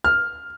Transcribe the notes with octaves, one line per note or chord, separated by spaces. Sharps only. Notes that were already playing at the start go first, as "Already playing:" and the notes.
F6